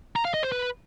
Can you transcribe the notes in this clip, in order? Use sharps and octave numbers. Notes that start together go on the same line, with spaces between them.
A#5
F5
D#5
C5
B4